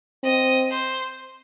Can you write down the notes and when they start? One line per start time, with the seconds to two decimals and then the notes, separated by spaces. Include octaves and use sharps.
0.23 C4 D#5
0.70 C5